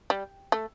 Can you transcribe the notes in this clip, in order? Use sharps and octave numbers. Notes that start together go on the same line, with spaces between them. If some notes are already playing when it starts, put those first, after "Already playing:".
G3
A3